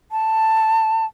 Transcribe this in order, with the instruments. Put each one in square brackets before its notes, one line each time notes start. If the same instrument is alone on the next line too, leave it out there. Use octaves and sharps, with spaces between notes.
[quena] A5